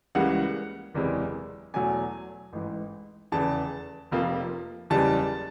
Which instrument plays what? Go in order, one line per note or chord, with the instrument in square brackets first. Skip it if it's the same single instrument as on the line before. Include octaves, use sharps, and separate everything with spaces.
[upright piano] C#2 C#3 E3 G3 A#3 F#5
F#1 E2 C3 E3 G#3
E2 B2 F#3 A3 G#5
A1 G#2 E3
F1 E2 C#3 E3 A5
F1 F2 C3 F3 A#3
F#1 E2 C#3 E3 G3 A5